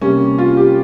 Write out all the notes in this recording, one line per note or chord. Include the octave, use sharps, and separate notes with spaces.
C3 G3 A#3 C#4
F4
G4